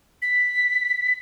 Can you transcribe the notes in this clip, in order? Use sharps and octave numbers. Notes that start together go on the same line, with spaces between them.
B6